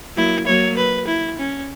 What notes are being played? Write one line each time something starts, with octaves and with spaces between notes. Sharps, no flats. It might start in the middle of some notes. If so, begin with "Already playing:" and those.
F#3 A#3 E4
F#3 A#3 C#5
B4
E4
C#4